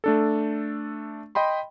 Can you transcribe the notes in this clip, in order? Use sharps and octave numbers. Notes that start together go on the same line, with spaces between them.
A3 D4 A4
D#5 G5 B5 C6